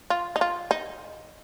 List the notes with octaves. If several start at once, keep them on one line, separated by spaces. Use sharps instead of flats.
F4
D#4
F4
D#4